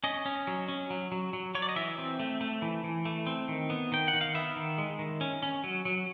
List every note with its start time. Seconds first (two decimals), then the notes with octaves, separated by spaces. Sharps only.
0.04 C#4 D#5
0.26 C#4
0.47 F#3
0.68 C#4
0.90 F#3
1.12 F#3
1.33 F#3
1.55 F#3 C#5
1.62 D5
1.69 D#5
1.76 E3 E5
1.98 C4
2.20 A3
2.41 A3
2.62 E3
2.84 E3
3.05 A3
3.27 C4
3.48 D#3
3.70 B3
3.92 D#3 G5
4.08 F#5
4.13 D#3
4.21 F5
4.35 B3 E5
4.56 D#3
4.78 G#3
4.99 D#3
5.21 C#4
5.43 C#4
5.64 F#3
5.85 F#3